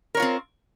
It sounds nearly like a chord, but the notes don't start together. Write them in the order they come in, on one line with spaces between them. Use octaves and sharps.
A#4 C#5 F4 C4